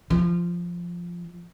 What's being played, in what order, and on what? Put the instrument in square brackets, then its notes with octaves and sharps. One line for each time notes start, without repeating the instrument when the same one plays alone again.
[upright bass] F3